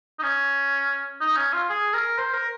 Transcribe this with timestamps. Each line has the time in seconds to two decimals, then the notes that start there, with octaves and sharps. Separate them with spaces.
0.19 D#4
0.23 C#4
1.21 D#4
1.36 C#4
1.53 F4
1.69 G#4
1.94 A#4
2.18 C5
2.34 A#4